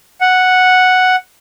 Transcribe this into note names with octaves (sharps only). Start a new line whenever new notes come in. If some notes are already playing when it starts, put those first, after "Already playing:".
F#5